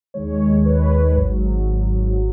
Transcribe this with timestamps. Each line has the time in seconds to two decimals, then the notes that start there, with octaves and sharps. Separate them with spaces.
0.14 D#2 D#3 G#3 C#5
0.66 B4
1.15 G#1 G#2 F#3